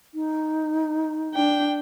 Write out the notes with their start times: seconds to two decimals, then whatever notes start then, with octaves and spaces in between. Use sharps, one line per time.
0.14 D#4
1.35 D4 G5